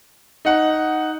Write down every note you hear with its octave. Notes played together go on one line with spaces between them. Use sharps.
D#4 F#5